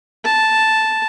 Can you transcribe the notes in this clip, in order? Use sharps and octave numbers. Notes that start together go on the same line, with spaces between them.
A5